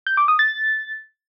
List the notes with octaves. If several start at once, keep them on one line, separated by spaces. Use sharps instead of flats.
G6
D6
D#6
A6